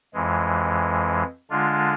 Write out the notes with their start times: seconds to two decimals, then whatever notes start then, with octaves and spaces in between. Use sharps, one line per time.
0.14 F2 E3 G#3
1.50 D3 G#3 D4 F4